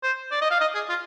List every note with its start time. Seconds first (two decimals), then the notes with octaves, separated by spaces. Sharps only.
0.03 C5
0.32 D5
0.41 D#5
0.51 F5
0.61 D#5
0.75 G#4
0.89 F4